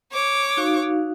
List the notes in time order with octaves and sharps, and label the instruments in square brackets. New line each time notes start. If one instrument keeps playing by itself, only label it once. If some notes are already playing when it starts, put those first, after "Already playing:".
[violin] C#5 D6
[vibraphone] D#4 F#4 F5